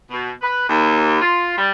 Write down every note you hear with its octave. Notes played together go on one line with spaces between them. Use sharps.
B2
B4
D#2
F4
G3